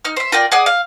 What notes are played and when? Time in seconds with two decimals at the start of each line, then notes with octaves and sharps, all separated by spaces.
0.05 D#4 F6
0.17 C5 E5
0.32 F4 A#4 D5 G5
0.52 G#4 D5 F#5 D#6
0.66 F5